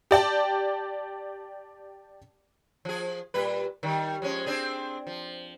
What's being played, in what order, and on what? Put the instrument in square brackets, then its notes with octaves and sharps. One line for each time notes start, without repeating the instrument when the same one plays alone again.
[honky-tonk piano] G4 D5 G5 A5
[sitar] F3 G#4
A#2 G3 B4
D#3 G3
F3 G#3 C#4
C4 D4 G#4
F3